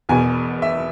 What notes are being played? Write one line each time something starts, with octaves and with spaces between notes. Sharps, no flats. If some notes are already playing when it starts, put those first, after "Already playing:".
E1 E2 B2 G#5
E5